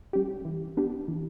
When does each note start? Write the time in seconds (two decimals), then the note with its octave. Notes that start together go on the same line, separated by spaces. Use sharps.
0.13 G3 C#4 G4
0.45 E3
0.77 B3 D4 G4
1.08 E3